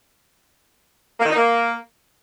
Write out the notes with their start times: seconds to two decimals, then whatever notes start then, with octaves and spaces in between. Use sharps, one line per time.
1.18 A#3
1.24 D#3
1.30 D#4
1.36 A#3